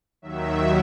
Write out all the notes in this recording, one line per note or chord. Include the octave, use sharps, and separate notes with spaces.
D#2 D#3 F#3 E5